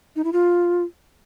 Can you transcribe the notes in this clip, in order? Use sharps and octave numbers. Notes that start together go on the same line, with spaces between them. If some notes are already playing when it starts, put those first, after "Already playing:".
D#4
E4
F4